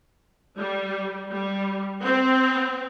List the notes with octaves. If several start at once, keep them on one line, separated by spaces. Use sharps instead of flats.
G3
G3
C4